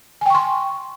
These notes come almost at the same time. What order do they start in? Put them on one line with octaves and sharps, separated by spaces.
G#5 G5 C#6 C6